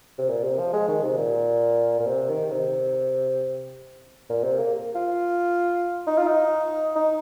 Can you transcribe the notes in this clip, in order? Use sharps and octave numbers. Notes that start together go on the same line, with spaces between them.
C3
A#2
C3
F3
G#3
D#3
C3
A#2
A#2
C3
D#3
C3
A#2
C3
A#3
F4
D#4
F4
D#4
D#4